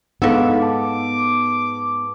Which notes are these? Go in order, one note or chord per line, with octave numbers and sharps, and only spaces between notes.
G#2 B3 D4 D#4 A4 F5
A5 D6